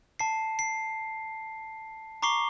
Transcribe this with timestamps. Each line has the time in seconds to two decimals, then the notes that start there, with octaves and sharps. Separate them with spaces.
0.19 A5 C7
0.59 C7
2.22 A#5 C#6 D6 C7 G7